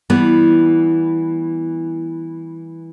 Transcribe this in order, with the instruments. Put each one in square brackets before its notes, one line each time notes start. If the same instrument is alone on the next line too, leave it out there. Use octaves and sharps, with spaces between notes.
[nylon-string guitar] E3 G3 B3